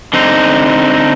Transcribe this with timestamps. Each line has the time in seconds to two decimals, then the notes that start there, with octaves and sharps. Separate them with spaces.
0.13 D3 C4 D#4